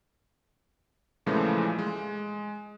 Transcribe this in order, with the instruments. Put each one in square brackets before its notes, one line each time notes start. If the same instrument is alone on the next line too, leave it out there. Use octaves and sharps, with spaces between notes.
[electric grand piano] A#2 C#3 E3 F3 G#3 A3
G#3